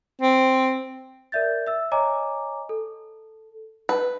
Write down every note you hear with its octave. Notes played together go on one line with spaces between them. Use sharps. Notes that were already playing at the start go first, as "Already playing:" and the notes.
C4
A#4 D5 E5 G6 A6
E5 E6
C#5 D#5 G#5 A#5 D6
A4
B4